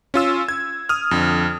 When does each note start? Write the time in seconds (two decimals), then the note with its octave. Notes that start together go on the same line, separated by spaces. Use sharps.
0.14 C#4 F4 E6
0.49 G#6
0.89 D#6 F6
1.11 F2 D3